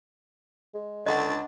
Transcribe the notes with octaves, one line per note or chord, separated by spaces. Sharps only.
G#3
C#2 D3 D4 D#5 F#5 A6